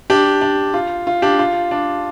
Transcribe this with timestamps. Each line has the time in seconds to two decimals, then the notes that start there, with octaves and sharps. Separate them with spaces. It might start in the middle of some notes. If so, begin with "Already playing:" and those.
0.10 D4 G4
0.42 D4
0.74 F4
1.07 F4
1.22 D4 G4
1.39 F4
1.71 D4